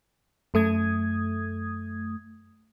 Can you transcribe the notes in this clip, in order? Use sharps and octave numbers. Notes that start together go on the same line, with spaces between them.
F#2 A3 D#6 G#6